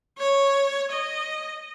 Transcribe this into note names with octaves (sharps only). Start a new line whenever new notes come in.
C#5
D#5